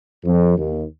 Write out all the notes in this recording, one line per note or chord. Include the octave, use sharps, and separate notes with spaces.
F2
D#2